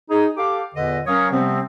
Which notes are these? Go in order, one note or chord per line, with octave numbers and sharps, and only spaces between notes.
D#4 G#4
G4 A4 F5 D6
E2 A#2 D3 B4 D#5
F#3 C#4 A#4 C#5 F5 D#6
C3 F3 G3 B3 C4